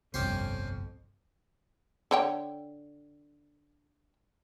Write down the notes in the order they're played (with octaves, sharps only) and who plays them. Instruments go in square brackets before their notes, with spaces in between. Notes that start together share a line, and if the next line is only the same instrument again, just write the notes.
[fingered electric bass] G1 C2 [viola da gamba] F2 [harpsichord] C#4 G4 C5
[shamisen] D3 C#5 G5